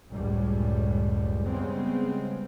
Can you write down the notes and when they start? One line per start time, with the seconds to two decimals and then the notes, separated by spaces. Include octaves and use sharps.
0.13 F#1 C#2 A2 G3
1.48 C#3 G3 G#3 B3 C4